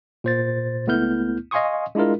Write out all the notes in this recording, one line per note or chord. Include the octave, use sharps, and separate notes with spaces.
A#2 C5 A6
C#2 A3 B3 E4 F6 G6
D#5 F5 G#5 C6 C#6 D#6
G#3 D4 E4 F4 A#4